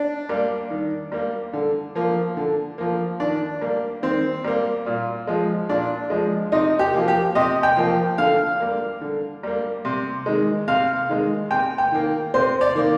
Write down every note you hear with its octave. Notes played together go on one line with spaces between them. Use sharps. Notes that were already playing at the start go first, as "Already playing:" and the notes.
Already playing: D4
G3 A#3
D#3
G3 A#3
D3
F3 A#3
D3
F3 A#3
D#3 D4
G3 A#3
D#3 C4
G3 A#3
A#2
F3 G#3
A#2 D4
F3 G#3
C3 D#4
G4
F3 A#3
G4
C3 D#5
G5
F3 A#3
D3 F5
G3 A#3
D3
G3 A#3
C3
D#3 G#3
C3 F5
D#3 G#3
C3 G5
G5
D#3 A#3
C3 C5
D5
D#3 A#3